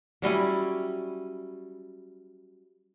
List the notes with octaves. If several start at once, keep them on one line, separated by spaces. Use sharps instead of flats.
F#3 G3 C#4 E4